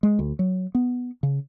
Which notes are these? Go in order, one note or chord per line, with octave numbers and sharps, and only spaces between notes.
G#3
D2
F#3
B3
C#3